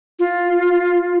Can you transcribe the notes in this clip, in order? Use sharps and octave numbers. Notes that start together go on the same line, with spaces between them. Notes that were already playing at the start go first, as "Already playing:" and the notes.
F4